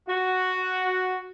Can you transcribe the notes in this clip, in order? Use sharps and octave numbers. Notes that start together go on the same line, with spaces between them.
F#4